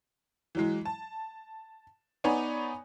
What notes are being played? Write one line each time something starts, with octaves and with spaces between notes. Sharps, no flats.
E3 F#3 G#3
A5
B3 D#4 B4 C#5 D5 G#5